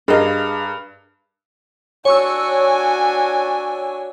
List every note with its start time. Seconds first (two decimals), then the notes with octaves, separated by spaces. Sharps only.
0.08 G2 G#4 A#4 D#5 F5
2.05 D4 F#4 C#5 G#5 C#6 E6